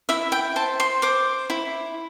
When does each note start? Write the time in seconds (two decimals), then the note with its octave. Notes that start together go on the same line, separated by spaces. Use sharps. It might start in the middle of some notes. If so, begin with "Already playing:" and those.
0.09 E4 E5
0.32 G5
0.56 C5 A5
0.80 C6
1.02 C5 D6
1.50 E4